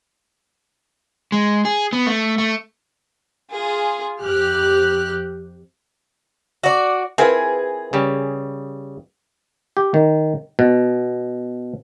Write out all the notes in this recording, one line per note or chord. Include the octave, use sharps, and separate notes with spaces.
G#3
G#4
B3
A3
A3
F4 G#4
F2 G4 F6 F#6
F#4 D5
C4 E4 F4 G#4 A#4 B4 F#5
C#3 G3 G4
G4
D#3
B2